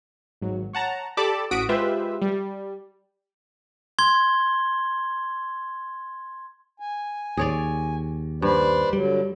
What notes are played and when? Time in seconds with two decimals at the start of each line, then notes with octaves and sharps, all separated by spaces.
0.42 G#1 F#3
0.73 C#5 F#5 A5 A#5
1.17 G4 A4 D5 A5 B5 D6
1.51 A1 F#4 D#6 B6 D7
1.69 G#3 F4 G4 B4 C5 E5
2.22 G3
3.99 C6 G#6 G7
6.80 G#5
7.37 D#2 G#4 C#5 D5
8.42 G2 B4 C5 D5
8.93 D3 F#3 G3